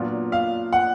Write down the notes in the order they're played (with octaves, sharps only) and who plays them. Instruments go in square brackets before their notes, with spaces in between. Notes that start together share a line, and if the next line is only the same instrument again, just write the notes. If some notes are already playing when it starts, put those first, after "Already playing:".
Already playing: [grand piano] A#2 F#3 B3 D4 F4
[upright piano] F5
F#5